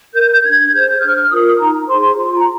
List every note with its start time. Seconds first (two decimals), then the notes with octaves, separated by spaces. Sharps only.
0.14 A#4 G6
0.32 G6
0.44 D4 G#6
0.72 G#4 C5 G6
1.00 D4 F6
1.30 F4 A#4 D#6
1.58 D#4 A#5
1.87 G#4 C5 C6
2.16 F4 C6
2.37 A#5